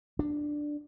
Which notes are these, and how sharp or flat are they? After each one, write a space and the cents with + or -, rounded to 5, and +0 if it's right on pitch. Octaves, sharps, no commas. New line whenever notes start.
D4 +5